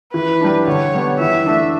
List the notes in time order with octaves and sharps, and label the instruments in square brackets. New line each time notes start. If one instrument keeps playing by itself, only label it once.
[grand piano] E3 [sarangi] B4
[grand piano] G3 D4
[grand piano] D3 [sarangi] C#5
[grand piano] G3 B3
[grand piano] E3 [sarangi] E5
[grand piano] A3 D4